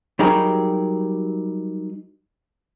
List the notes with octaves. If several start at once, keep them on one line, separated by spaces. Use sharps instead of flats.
F#3 G3 D#4 G4 G#4 A#4